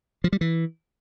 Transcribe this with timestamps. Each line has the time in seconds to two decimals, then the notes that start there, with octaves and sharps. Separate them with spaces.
0.24 F3
0.33 G3
0.41 E3